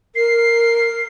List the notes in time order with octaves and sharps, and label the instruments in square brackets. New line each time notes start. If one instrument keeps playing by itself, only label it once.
[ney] A#4 [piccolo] C7